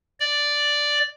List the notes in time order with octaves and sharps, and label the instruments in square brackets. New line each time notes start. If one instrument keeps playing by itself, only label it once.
[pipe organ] D5